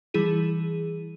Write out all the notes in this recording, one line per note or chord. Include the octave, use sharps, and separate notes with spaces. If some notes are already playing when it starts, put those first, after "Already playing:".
E3 G3 E4 G#4 D#7